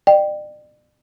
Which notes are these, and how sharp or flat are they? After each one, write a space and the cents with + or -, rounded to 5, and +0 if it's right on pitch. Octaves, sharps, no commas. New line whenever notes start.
D5 +40 G5 -5